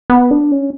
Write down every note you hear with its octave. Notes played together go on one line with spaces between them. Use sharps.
B3
D4
C#4